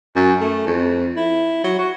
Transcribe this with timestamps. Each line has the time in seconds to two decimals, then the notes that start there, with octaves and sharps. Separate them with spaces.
0.15 F#2
0.40 A3
0.66 F2
1.16 E4
1.64 F#3
1.78 F#4